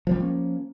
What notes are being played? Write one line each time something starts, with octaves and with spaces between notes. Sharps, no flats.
F3 G3 A#3 C#4